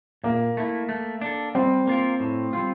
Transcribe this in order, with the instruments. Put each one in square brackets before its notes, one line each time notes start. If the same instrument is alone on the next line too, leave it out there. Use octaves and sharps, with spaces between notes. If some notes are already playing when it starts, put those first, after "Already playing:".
[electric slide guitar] A#2 [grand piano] A#3
[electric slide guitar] A3 E4
A3
D4 A4
[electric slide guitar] G3 [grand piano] C4
[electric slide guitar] A#3 F4 A#4
A2
G3 C4 F4